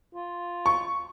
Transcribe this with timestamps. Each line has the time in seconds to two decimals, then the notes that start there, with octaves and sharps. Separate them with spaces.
0.15 F4
0.66 C#6